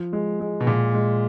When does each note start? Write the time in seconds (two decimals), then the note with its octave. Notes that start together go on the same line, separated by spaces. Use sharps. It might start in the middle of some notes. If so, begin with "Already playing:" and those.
Already playing: F3
0.13 G#3
0.40 G#3
0.60 B2
0.66 A#2 G#3
0.94 G#3